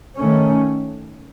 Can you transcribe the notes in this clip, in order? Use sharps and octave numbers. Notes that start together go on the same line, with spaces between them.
D#3 A3 C#4